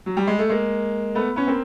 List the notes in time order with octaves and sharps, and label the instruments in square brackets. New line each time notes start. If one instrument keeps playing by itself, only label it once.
[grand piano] F#3
G3
G#3
A3
G#3 A#3
A3 B3
B3 C#4
A#3 C4